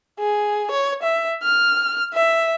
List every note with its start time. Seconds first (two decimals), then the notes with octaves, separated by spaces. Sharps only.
0.20 G#4
0.71 C#5
1.02 E5
1.43 F6
2.14 E5